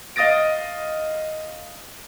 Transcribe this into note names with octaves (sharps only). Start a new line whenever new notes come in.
D#5 F5 D#6 A6 A#6 D7